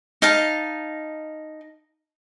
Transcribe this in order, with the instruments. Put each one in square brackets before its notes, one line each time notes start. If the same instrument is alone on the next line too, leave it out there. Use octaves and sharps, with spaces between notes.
[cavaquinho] D#4 F5 A5